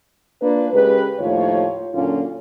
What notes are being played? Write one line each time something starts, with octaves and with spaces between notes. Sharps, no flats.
A#3 D4 F4 B4
C#3 G#3 G4 A#4 B4
D#2 A2 F3 F4 C#5
F#2 A#2 D3 A#3 C#4 F4